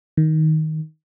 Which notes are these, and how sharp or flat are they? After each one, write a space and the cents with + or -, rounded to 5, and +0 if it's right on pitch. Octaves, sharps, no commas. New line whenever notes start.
D#3 +10